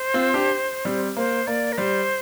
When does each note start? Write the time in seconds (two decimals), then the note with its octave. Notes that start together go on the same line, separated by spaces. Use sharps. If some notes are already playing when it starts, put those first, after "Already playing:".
Already playing: C5
0.14 C4 F4
0.34 D4 G4
0.85 G3 C4
1.16 A#3 C5
1.47 A#3 D5
1.72 A#4
1.78 G3 C5